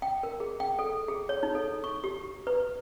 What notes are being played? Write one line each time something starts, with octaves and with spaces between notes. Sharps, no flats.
G5
A#4
G#4
G5
A4
G#4
C#5
D#4
A4
C#6
G4
B4